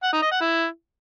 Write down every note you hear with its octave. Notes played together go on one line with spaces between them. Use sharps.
F#5
D#4
D#5
F#5
E4